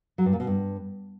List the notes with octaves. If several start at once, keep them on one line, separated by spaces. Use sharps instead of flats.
F#3
G2
A#2
B2
G2